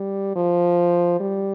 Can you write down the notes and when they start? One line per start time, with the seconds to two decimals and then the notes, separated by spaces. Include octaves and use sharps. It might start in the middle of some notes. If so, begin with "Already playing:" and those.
Already playing: G3
0.36 F3
1.20 G3